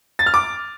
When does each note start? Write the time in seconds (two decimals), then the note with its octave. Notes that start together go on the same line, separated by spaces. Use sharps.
0.19 A6
0.26 F6
0.34 D6